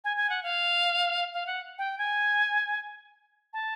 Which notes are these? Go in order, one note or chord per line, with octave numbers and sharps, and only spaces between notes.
G#5
G#5
F#5
F5
F5
F#5
G5
G#5
A5